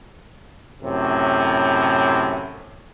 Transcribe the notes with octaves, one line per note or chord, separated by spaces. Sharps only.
F#2 A2 C3